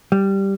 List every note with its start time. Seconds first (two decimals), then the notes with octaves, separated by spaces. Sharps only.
0.12 G3